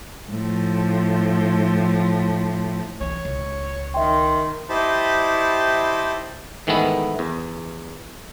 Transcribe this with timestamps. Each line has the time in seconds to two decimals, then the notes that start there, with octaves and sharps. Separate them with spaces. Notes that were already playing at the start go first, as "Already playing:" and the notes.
0.31 A2 F3
3.01 E3 C4 C#5
3.25 C#2
3.94 D#3 E5 G5 C6
4.69 E4 G4 C5 D#5 A5 B5
6.67 G#2 D#3 E3 A3 B3 E4
7.19 E2